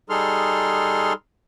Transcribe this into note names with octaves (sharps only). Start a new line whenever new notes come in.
G3 D#4 G#4 A4 C6 F6